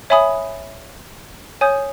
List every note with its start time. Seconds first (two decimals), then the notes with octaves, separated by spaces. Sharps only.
0.10 C#5 E5 G#5 B5 D#6
1.61 C#5 G#5 D#6 G6